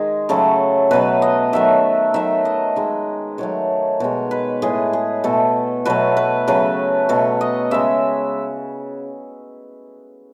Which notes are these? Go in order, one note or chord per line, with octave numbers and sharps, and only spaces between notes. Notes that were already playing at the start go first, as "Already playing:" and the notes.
Already playing: D#3 G#3 G#4
C#3 F#3 A3 A4
B2 F#3 A3 B4
D#5
D#3 F#3 A3 E5
D#3 F#3 A3 E5
D#5
D#3 G#3
D#3 F#3 A3 C#5
B2 G#3 C#5
B4
A2 G#3 G#4
G#4
B2 A3 A4
B2 F#3 A3 B4
B4
C#3 F#3 A3 B4
B2 A3 C#5
D#5
C#3 G#3 E5